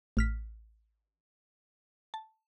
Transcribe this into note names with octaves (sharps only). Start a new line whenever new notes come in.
A1 F6 B6
A5